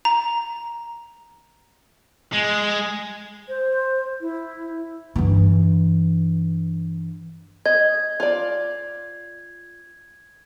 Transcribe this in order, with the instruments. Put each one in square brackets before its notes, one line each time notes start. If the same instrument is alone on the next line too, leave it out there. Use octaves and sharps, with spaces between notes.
[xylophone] A#5
[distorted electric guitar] G#3
[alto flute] C5
E4
[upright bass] G2 E3
[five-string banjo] D#5 [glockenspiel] G#6
[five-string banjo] F4 D5